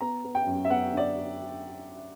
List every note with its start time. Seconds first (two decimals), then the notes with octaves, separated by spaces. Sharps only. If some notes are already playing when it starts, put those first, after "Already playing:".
0.01 B3 A#5
0.25 B3
0.35 G5
0.46 F#2
0.65 E5
0.70 B3 F#5
0.92 D3
0.97 D5